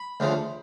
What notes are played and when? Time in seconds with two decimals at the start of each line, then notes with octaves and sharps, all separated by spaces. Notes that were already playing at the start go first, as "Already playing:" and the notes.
Already playing: B5
0.20 D2 C#3 F3